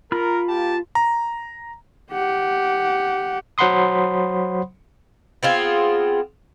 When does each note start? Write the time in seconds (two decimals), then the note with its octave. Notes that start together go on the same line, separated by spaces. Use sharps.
0.12 F4 A#4 B5 F6
0.49 A#3 G4 A5
0.95 A#5
2.12 G4 F#5
3.58 F#3 C5 F#5 B5 C6 D#6
5.43 B3 C4 F4 G#4